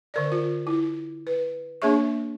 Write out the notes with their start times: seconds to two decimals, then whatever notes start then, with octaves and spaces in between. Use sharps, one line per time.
0.14 D3 A#4 D5
0.32 F4
0.67 E4
1.27 B4
1.82 A#3 D4 G#4 C#5 E5 C#6